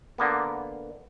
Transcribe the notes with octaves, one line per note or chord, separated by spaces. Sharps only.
D3 A#3 B3